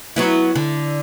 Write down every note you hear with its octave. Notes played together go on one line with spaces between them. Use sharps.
F#3 B3 E4
D3